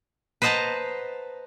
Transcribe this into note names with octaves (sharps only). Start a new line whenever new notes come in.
B4 C5 D#5 F#5 A5 A#5